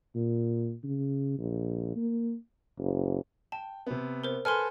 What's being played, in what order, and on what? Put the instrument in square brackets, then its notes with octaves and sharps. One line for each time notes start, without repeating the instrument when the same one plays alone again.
[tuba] A#2
C#3
A#1
A#3
F#1
[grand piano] G5 [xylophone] A5
[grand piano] C3 B3
[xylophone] A#4 C5
[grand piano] A4 B4 G#5 [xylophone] C6 F6